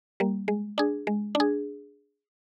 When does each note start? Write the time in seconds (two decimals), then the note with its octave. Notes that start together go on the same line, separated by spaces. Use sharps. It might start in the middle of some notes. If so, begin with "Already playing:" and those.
0.20 G3 A#3
0.48 G#3
0.78 D4 G#4
1.07 G#3
1.35 D4
1.40 G#4